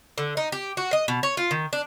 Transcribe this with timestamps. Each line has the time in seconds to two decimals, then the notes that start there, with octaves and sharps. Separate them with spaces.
0.18 D3
0.37 D#4
0.52 G4
0.77 F#4
0.93 D#5
1.08 B2
1.23 C#5
1.37 F4
1.51 D#3
1.73 D4